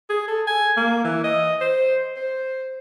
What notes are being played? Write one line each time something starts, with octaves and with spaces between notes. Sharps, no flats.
G#4
A4
G#5
A#3
E3
D#5
C5
C5